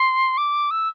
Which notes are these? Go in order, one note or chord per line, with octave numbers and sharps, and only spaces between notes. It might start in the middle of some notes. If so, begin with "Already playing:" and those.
Already playing: C6
D6
E6